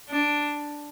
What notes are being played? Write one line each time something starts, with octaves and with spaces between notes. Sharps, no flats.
D4